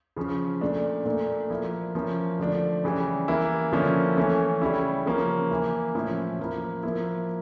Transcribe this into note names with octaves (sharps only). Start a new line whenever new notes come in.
C#3 F3 C#4
A#2 A3 D4
A#2 A3 D4
F3 A#3 E4
F3 A#3 C#4 E4
D3 F3 A3 D4
C#3 E3 G3
E3 A#3 E4
D3 F3 A#3 C#4 E4
E3 A3 C#4
C#3 G3 C#4 E4
C#3 F3 A#3 C#4
E3 A#3 E4
A2 F3 C#4 E4
F3 A#3 E4
F3 A#3 E4